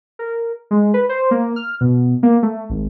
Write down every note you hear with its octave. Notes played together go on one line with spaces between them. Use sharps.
A#4
G#3
B4
C5
A#3
F6
B2
A#3
A3
G#1